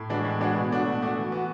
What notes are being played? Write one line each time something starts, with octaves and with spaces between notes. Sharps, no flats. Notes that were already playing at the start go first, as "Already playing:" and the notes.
Already playing: A2
E3 G#3 D4 F#4
A2
E3 G#3 D4 F#4
B2
A3 D4 F#4
B2
A3 D4 F#4
E3
B3 F#4